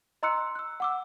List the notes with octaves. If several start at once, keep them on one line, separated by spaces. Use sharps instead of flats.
D#5 A#5 C6 E6 F#6 C#7
E6 F#6
F#5 D6 E6